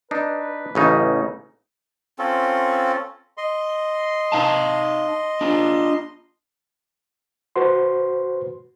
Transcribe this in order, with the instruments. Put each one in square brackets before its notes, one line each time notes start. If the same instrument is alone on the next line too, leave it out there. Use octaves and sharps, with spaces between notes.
[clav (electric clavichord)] D4 D#4 [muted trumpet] B4
[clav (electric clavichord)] A1 C#3 D#4
[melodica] C4 C#4 F4 A4
[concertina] D#5 C6
[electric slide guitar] D#4 F5 A5
D4 F4
[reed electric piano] F#4 B4 C5 C6